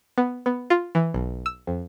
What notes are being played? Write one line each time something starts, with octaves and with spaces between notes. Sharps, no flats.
B3
B3
F4
E3
B1
E6
F2